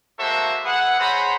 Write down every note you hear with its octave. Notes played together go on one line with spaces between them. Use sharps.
G#3 A#3 F#4 A4 C5 E5
G#4 B4 E5 F#5
G#4 C5 C#5 F#5 A#5 B5